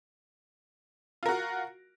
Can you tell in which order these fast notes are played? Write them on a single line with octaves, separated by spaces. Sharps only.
F4 A#4 F#4